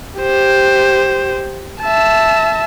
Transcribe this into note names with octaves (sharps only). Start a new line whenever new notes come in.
G4 C5
E5 A5